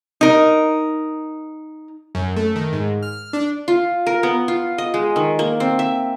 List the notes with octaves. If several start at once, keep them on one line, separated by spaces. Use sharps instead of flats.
D#4 A#4
F#2
A3
D#3
G#2
F6
D4
F4
A#4
B3
F4
D#5
G#3
D#3
A#3
C4
E5